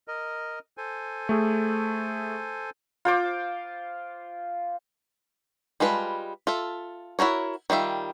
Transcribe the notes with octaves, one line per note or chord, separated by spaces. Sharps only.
A#4 D#5
A4 C5 G#5
A3 G#4
F4 C5 D6
G3 G#3 F4 B4 A5
F4 A4 E5
E4 F#4 A#4 C#5
D#3 G3 F4 E5